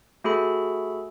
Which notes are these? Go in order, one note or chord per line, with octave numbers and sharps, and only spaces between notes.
A3 F#4 G#4 A4 B5